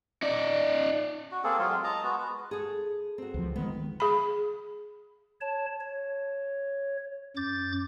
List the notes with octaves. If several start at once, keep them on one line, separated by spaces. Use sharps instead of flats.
D#4 D5
F#4
A#3 C4 G#4 A4
F#3 G#3 F4
D#5 A5 A#5
G#3 B3 F#4
B4
G#4 A4
C4 F#4
C#2 F3
D#3 G#3 B3
G#4 B5
C#5 A5
C#5
F#2 D6 G6 A6